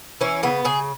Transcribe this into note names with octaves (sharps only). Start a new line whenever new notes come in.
E3 C#4
C#3 B3
C#3 G#4